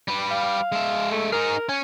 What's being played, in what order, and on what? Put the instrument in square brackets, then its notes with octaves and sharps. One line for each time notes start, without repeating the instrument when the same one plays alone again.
[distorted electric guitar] G3 B4
[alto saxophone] F5
[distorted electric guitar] G#3 E5
[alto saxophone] A3
[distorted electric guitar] D#4 G#4 [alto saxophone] A#4
[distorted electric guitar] C#4 [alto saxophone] G#5